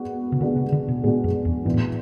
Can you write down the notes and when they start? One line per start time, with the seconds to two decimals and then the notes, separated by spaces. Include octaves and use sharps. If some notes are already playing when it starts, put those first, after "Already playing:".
Already playing: G#3 B3 D4 F#4
0.32 C#3
0.41 D3 G#3 B3 D4 F#4
0.56 C#3
0.72 D3
0.88 B2
1.04 A2 G#3 B3 D4 F#4
1.24 F#2
1.45 E2
1.65 G#2 E3 B3 D4
1.74 A2